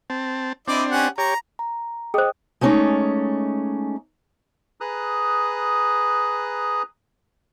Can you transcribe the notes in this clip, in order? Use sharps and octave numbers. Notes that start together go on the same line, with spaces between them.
C4 A5
C4 D4 E4 D5 D#5
C#4 G4 F#5
G4 C#5 A#5
A#5
G#4 C5 D#5 G5 D#6
G#3 A3 C#4 D#4 D5
G#4 B4 A#5 D#6 F#6